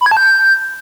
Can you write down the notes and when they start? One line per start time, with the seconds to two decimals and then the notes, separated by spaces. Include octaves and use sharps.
0.01 B5
0.06 G#6
0.11 A5
0.17 G6